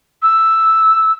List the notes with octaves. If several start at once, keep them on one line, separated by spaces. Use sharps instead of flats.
E6